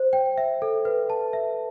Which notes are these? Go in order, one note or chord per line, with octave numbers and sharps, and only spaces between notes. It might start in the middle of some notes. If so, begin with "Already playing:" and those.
Already playing: C5
G5
E5
A4
B4
A5
E5